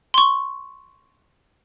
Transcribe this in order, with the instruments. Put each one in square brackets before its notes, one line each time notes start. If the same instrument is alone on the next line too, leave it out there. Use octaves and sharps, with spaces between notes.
[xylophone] C6 C#6